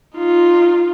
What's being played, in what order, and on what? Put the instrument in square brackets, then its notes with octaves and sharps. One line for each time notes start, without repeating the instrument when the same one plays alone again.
[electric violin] D#4 F4